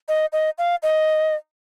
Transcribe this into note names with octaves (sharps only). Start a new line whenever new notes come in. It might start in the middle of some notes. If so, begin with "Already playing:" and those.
D#5
D#5
F5
D#5